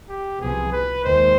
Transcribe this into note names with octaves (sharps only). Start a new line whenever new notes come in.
G4
C2 C3 F3 B3 G#4
B4
D#2 D#3 G#3 C5